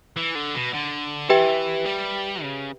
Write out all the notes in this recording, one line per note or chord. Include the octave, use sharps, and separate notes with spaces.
E3
D3
B2
D3
E3 G4 B4 E5 G5
G3
C#3